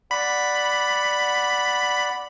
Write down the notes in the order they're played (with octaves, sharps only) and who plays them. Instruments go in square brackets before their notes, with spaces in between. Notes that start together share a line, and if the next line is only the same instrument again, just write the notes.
[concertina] D5 F#5 [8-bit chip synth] B5